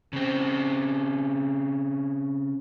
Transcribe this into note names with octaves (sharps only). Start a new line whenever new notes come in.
C#3 C4